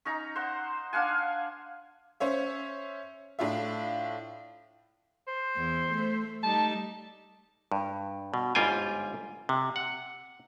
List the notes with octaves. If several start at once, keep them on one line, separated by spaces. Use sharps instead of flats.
C#4 D#4 A#5
C5 F#5
D4 F5 F#5 G#5
C#4 C5 C#5 E5
A2 D4 F4 E5
C5
E2
A3
G3 A3 D#4 A5
G2
B2
G1 G#2 G3 F4 G5 G#5
C3
F#5